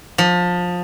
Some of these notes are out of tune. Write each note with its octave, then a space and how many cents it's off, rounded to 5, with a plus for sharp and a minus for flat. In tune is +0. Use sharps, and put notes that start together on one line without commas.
F3 +25